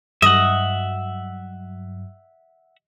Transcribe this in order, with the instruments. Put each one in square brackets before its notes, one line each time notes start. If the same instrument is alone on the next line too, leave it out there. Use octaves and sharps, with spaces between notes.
[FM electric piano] G2 F#3 [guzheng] D#5 [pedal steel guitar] E5 F#5